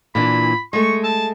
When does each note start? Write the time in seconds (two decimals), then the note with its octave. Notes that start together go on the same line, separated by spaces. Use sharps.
0.15 A#2 E3 D4 B5
0.73 G#3 A3 C#6
1.04 A5